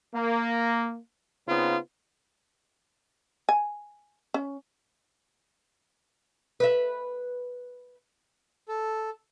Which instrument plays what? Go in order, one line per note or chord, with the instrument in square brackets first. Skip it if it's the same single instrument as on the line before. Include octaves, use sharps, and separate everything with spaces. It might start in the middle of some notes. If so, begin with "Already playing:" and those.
[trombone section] A#3
C#3 B3 C4 D#4 F4
[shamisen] G#5
C#4
[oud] B4 E5
[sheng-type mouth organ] A4